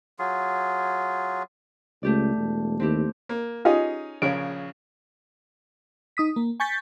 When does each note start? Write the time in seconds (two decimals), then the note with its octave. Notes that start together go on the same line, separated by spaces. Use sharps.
0.19 F#3 F4 G#4
2.03 C#2 A3 G4 D5
2.36 E1
2.80 D#2 C4 E4 G4
3.29 A#3
3.65 C#4 D#4 F4 G4 G#4 D#5
4.22 A#1 C#3 C#5 D7
6.17 D#4 D#6 B6
6.36 A#3
6.60 G#5 C#6 G6 A6 B6